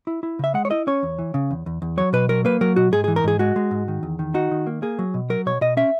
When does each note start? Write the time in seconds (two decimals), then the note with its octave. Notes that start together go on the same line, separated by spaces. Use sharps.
0.07 E4
0.23 E4
0.39 C#3 E5
0.54 G#3 F#5
0.65 C#5
0.71 E4 D#5
0.87 C#4 C#5
1.03 E2
1.19 E3
1.34 C#3
1.51 E2
1.66 E2
1.82 E2
1.97 F#3 C#5
2.13 B2 B4
2.29 F#3 A#4
2.45 A#3 B4
2.61 F#3 A#4
2.76 B2 F#4
2.92 G#2 G#4
3.04 G#4
3.08 E3
3.16 A#4
3.24 G#2 G#4
3.39 G#3 F#4
3.56 G#3
3.71 G#2
3.88 D#3
4.03 E2
4.19 D#3
4.34 D#4 F#4
4.51 D#3
4.67 A#3
4.82 A#3 G#4
4.99 F#3
5.14 B2
5.30 F#3 A#4
5.46 B2 C#5
5.61 B2 D#5
5.77 C#4 E5